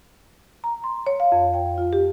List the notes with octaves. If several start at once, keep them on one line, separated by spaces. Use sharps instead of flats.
A#5
C6
C#5
F5
F2
G5
F4
G4